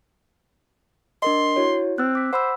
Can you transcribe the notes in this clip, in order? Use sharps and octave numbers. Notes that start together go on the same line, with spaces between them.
D4 A#4 D#5 C6
E4 F#4 C#5
C4 E6 F#6
D6 B6
C5 F#5 B5 E6